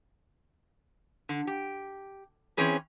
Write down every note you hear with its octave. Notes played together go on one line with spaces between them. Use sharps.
D3
G4
E3 C4 C#4 G#4 B4